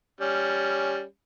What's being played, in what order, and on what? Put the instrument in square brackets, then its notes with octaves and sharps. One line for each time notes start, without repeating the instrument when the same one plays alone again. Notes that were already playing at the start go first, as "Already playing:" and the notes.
[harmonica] G3 C#4